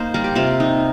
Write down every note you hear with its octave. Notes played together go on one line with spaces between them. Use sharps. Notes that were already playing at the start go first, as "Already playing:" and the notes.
Already playing: A#3 D#4 C5
G3 A#4
G4
C3 F4 A#4
D#4